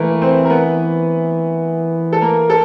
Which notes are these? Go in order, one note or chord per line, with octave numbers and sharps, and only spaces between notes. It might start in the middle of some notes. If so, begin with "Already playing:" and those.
Already playing: E3 A3 A#3 A#4 B4
C4 C5
A#4
B3 B4
A4
A#3 A#4
A4